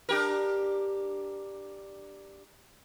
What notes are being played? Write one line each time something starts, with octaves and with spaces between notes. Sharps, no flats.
D4 G4 A#4